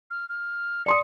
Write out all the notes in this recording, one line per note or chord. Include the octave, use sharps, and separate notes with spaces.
F6
F6
D5 C6 D#6 C#7